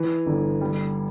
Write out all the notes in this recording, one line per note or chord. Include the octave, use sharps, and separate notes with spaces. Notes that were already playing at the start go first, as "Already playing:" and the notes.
Already playing: E3
G1
G3